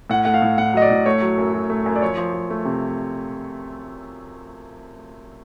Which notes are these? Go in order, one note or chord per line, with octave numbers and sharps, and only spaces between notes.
A2 F#5
A3 F#5
F5
A2
A2 F#5
F#3 D#5
D5
A2
A3 C#5
F#3
F#2
F#3
A3
F#2
D5
F3 C#5
F3
F3
A3
C3